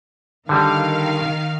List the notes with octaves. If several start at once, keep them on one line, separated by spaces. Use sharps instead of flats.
D3 D#3 G3 F5